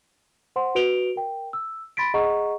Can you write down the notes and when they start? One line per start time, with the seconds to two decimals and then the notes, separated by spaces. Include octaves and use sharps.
0.56 C5 F#5 C6
0.75 F#4 B4 D7 F7 G7
1.16 A#4 G5
1.53 E6
1.97 B5 C6 A6 B6 D7
2.14 G#4 D#5 F#5 A#5 C#6